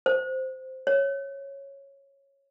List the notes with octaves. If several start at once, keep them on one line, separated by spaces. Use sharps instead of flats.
C5
C#5